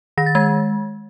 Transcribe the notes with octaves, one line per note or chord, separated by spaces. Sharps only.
D#3 A#6
A6
G#3 G#6